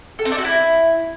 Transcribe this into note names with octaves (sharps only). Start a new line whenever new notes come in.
A4
C4
D4
F#4
E4